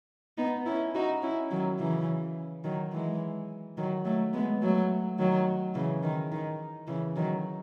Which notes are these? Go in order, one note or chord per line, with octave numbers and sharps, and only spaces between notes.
B3 D#4
C#4 E4
D#4 F#4
C#4 E4
D#3 F#3
C#3 E3
D#3 F#3
E3 G#3
D#3 F#3
F#3 A3
G#3 B3
F#3 A3
D#3 F#3
C#3 E3
D#3
D#3
C#3 E3
D#3 F#3